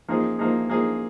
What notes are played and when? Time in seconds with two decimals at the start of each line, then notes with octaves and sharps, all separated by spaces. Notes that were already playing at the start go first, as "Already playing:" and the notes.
0.08 F3 A#3 D#4 G#4
0.38 F3 A#3 D#4 G#4
0.68 F3 A#3 D#4 G#4